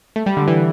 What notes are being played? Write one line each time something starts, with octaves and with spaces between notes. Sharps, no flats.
A3
G3
D3
E3